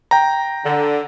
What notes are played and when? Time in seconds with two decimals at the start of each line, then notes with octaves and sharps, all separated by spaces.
0.11 G5 A#5
0.65 D3